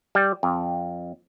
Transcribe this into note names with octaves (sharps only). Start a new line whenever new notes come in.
G3
F2